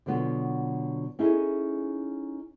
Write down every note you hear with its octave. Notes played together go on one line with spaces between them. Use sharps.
B2 D3 F#3 B3 F4
C#4 D#4 E4 G#4 A4 D#5